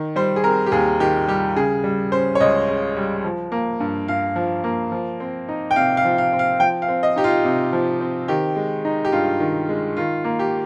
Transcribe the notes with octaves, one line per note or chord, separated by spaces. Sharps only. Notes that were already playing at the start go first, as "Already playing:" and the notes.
Already playing: D#3
G3 C5
G#4
C4 A#4
G4
D#2 G#4
D#3 G4
G3 G4
C#3 G#4
G3
C#4 C5
C#5
C#2 D#5
C#3
G3
F3
A#3
G2
G2 F5
F3
A#3
F3
C4
D#4
G5
C3 F5
F5
F3
F5
C4
F5
F3 G5
F5
C4
D#5
D#4 G4
F4
C3
F3
C4
D#3 G4
G#3
D#4
G4
G2 F4
D#3
G#3
D#3 F4
A#3
G4